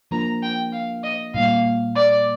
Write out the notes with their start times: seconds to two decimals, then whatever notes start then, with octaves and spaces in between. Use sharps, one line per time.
0.11 F3 A#3 D4 F4 A#4 A#5
0.42 G5
0.72 F5
1.04 D#5
1.34 A#2 G3 A#3 F5
1.95 D5